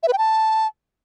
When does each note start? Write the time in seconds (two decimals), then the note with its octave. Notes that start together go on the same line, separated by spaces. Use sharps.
0.03 E5
0.08 B4
0.13 G5
0.18 A5